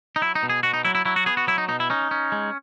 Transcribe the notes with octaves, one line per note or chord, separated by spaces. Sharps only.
D#4
F#3 E4
D#4
B2
G#4
B2 F#4
D#4
F#3 E4
E4
F#3 E4
F#4
B3 G#4
F#4
F#3 E4
D#4
B2 D#4
E4
C#4 D#4
C#4
G#3